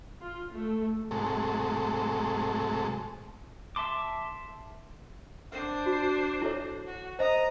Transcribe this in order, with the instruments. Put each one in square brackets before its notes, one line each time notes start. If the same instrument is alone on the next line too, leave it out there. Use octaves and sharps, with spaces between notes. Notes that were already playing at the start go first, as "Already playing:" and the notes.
[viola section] F4
A3
[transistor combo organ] G#2 C3 F#3 G#3 A3 A4
[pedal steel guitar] E5 A5 C6 D6
[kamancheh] D4 C5
[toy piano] F#4
E4 A4 C#5
[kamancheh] F#4
[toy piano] C5 D#5 [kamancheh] A#5 D#6